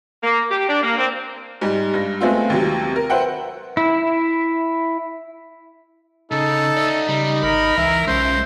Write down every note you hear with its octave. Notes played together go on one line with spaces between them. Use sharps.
A#3
G4
D4
A#3
C4
G#2 G3
G2 A#6
G#3 A3 B3 C4 F4
D#2 C3 F#3
A#4
B4 C5 E5 F#5 G5
E4
C#3 D#4 A4
D5 E5
C#3 G3
G#1 A#4 B5
C#2 E3 E5
B1 G#3 C#4 C5